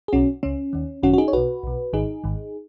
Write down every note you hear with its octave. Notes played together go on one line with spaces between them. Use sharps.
G#4
B1 B2 C#4 F#4
C#2 C#3 C#4
D#2 D#3
G#1 F#2 D#3 C#4 F#4
F#4
D#4 G#4
C#5
B1 B2 F#4 B4
B1 B2
G#1 G#2 D#3 D#4 G#4
G#1 G#2 D#3